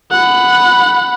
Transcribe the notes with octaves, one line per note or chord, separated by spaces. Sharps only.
F#5 B5